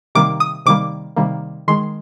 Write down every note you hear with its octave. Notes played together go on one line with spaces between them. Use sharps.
C3 D#3 G3 A#3 D6
D#6
C3 D#3 G3 A#3 D6
C3 D#3 G3 A#3
D#3 G#3 C6